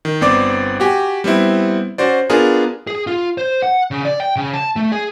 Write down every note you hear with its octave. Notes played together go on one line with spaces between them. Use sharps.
D#3
G1 B3 C4 D5 D6
F#4 G4 G#5
G3 B3 C4 E4
C#4 F#4 C5 D5
B3 D4 F4 G#4 A#4
G#4
F4
C5
F#5
C#3
D5
G5
C#3
A5
A3
G#4